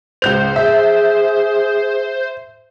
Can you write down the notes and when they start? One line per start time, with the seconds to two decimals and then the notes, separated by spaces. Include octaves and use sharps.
0.22 C#2 C5 G6 F7
0.56 G#4 E5